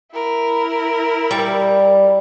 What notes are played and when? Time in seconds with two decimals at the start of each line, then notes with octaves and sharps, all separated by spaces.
0.13 E4 A#4
1.31 G3